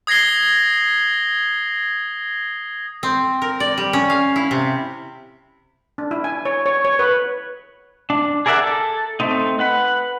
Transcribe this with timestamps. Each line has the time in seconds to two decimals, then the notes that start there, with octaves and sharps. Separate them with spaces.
0.07 D#6 G#6 A#6 C7 G7
3.03 C4
3.42 A#4
3.60 D5
3.78 G3
3.93 C#4
4.10 F5
4.36 E4
4.51 C3
5.98 D4
6.11 E4
6.24 G#5
6.45 C#5
6.66 C#5
6.85 C#5
6.99 B4
8.10 D4
8.46 G#4 A#4 D5 E5 F#5
8.64 A4
9.20 A3 C4 D#4
9.59 B4 F#5 B5